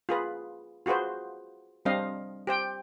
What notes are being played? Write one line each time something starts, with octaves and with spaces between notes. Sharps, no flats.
F4 G#4 B4
F4 F#4 G#4 B4 C5
G3 C4 D4 D#5 F5
G4 C5 G5